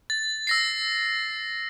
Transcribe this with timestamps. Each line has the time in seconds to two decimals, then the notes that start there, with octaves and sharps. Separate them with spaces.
0.10 A6
0.47 E6 A#6 C7